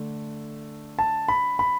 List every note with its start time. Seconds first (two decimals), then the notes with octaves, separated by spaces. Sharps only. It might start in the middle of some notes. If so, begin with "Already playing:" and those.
Already playing: D3 A3 D4
0.99 A5
1.28 B5
1.59 B5